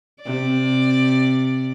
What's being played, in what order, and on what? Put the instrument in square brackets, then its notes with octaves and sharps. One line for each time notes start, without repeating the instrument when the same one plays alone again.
[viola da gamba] C3 D5